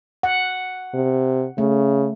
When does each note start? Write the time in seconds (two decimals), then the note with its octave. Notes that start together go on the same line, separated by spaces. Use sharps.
0.23 F#5
0.94 C3
1.58 C#3 A3